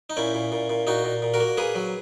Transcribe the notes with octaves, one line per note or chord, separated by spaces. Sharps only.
D#4
A#2 C#4 E4
A#2
A#2
A#2
A#2 D#4 F#4
A#2
A#2
F#4 A#4
A#3
A#3 G#4 B4
F#3